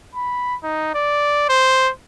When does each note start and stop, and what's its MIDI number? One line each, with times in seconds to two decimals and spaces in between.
0.15 0.55 83
0.63 0.93 63
0.94 1.48 74
1.49 1.90 72